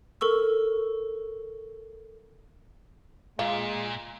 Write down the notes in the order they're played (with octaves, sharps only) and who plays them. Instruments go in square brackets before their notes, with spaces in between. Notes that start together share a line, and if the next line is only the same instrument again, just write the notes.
[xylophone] A4 A#4 C#6 E6
[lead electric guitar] A#2 [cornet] G#3 [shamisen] F4